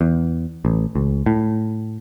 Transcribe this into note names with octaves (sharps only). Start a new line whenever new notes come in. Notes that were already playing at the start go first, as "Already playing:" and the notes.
E2
A1
C#2
A2